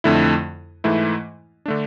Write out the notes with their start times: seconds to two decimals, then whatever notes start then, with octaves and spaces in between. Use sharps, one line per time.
0.04 F2 D3 A3 E4
0.84 G#2 E3 A3 E4
1.66 D3 A3 D4